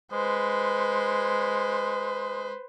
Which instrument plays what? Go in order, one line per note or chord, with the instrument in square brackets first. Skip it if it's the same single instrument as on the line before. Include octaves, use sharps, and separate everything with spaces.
[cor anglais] G#3 [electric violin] B4 C5